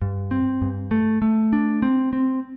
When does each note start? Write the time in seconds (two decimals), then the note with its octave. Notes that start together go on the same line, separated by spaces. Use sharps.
0.02 G2
0.31 C4
0.62 G2
0.91 A3
1.22 A3
1.53 D4
1.82 C4
2.13 C4